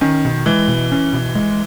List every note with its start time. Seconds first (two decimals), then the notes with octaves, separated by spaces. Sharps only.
0.01 D#3 C#4
0.25 B2
0.46 E3 G#3
0.68 B2
0.92 C#4
1.13 B2
1.35 G#3